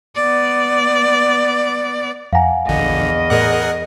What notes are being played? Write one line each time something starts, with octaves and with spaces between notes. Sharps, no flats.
B3 D5
F2 F5 F#5 G#5 A#5
A#1 E2 D3 D#5
A2 G#4 A#4 D5 F#5